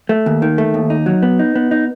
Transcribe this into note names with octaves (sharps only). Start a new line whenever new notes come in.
A3
D#2
D#3
A3
D#2
D#4
F#3
B3
D#4
B3
D#4